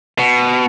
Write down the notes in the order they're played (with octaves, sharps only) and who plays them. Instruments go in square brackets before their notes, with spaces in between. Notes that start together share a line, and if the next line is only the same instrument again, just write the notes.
[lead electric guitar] B2